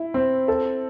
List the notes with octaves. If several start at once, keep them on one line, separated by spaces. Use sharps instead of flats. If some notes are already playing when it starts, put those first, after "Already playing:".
Already playing: E4
C4
A4